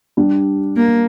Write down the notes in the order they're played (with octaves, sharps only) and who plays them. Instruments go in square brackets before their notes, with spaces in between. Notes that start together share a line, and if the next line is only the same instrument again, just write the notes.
[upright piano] G3 D4 G4
[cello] A#3